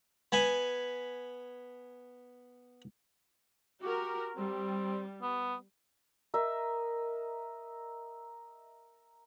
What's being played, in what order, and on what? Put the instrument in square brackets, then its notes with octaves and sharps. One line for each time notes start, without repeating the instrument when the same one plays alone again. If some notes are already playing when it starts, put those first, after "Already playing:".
[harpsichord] B3 G#5 B5
[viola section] F#4 A#4 [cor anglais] G4
[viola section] G3 [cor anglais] C4
[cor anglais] B3
[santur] A#4 D#5 E5